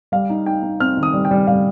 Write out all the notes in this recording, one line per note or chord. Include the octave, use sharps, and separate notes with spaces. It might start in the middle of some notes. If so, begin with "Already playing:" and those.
G3 F5
D#4
D#4 G5
D#4
C4 F6
D#3
D#6
G3
G5
G3
G3 F5